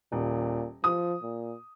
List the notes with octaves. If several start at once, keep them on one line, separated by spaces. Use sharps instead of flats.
D#1 A#2
F3 D#6
A#2